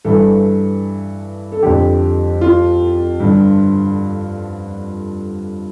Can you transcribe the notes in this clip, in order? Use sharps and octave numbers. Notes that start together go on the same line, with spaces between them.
G2 E3 A4
A4
F2 D3 G4
F4
G2 D3